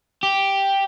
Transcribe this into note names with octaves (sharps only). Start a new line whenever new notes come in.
G4